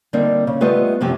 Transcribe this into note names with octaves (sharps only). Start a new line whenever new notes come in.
D3 G3 A#3 C4 D#4
C#3
G3 A3 B3 F4 C5 D#5
F#2 C3 F3 C#4 G4